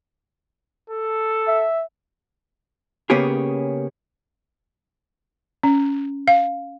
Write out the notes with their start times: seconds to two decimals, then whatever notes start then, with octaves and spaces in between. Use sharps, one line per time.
0.90 A4
1.47 E5
3.10 C#3 A#3 B3 C#4 G4 G#4
5.63 C#4
6.28 F5